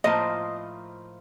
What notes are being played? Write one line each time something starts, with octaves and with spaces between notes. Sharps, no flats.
A2 F3 A#3 F4 C5 D#5